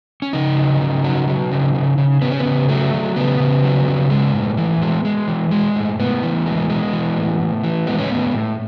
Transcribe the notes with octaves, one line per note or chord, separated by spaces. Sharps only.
C#4
C#3 D#4
F#3
C#3
F#3
F#3
C#3
C#3
C#3
C#3 B3
C#4
B3
C#3
F#3 A3
F#3
C#3 B3
C#3
F#3
C#3
G#3
A2
E3
G#3
G#3
E3
G#3
A2
A2 B3
E3
G#3
G#3
E3
A2
A2
E3
G#3 B3
C#4
A2 B3
A2